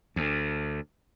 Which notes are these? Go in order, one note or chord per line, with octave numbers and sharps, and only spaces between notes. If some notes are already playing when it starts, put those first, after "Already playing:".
D2